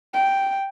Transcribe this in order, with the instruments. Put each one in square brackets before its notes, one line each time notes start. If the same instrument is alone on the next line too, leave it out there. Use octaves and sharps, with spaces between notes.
[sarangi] G5